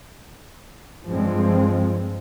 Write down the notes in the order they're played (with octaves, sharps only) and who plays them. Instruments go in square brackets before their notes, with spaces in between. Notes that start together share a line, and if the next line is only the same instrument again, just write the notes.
[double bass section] G2 F3 G#3 C4